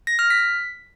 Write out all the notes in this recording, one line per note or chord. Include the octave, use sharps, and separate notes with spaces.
A#6
F6
B6